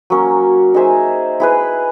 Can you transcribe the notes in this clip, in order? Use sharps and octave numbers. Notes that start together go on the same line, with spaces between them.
F#3 A#3 C#4
D#4 G#4 C5 E5
E4 G#4 B4